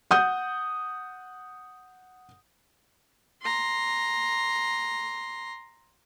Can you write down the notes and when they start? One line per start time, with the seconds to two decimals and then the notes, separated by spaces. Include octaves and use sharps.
0.11 F#5 D#6 G6
3.42 A#5 C6